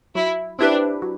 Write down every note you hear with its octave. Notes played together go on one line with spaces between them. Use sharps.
F#3 E4
C4 D4 E4 G4 B4
F#3